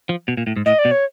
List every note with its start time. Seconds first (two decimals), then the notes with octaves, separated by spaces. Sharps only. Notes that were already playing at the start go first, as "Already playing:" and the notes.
0.09 F3
0.28 B2
0.37 A#2
0.47 A2
0.56 G#2
0.66 A2 D#5
0.79 D5
0.85 B2
0.91 C#5